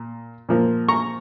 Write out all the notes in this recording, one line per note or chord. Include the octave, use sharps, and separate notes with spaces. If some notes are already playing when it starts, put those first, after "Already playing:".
Already playing: A#2
A#2 F3 A#3
A#5 C#6